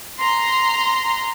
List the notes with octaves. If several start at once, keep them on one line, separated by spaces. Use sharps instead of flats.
A#5 C6